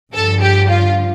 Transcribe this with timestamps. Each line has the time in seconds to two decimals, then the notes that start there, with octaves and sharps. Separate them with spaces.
0.14 G2 D3 F3 A4
0.42 G4
0.69 F4